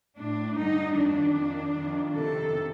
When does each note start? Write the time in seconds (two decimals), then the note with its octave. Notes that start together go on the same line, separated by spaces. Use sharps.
0.16 A2 D4
0.56 G2 D3 D#4
0.95 F2 D#3 D4
1.35 F2 D#3
1.74 F2 D#3
2.14 F2 C3 D#3 A4